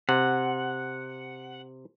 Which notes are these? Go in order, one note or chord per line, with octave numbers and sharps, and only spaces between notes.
C3 F#5